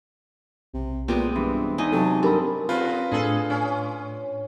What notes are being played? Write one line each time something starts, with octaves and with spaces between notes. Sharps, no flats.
B1 C3
A#2 G#3 B3 C4 G4
G2 E3
E2 D#4 D#5 G#5
C3 F#3 A4 A5
G2 C4 G4 A4 A#4 B5 D#6
C#3 C4 F4 B4
A2 D4 G#4 A4
C#4